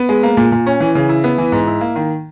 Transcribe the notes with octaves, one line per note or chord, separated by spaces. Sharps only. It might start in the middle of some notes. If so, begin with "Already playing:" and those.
Already playing: B3
G#3
A#3
A#2
A#2
C#4
E3
C#3
E4
B3
E3
G#2
E4
A#3
D#3